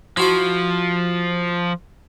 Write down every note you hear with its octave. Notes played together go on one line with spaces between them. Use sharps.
F3 E4 F#4 C5